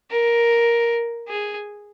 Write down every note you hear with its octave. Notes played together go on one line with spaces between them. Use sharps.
A#4
G#4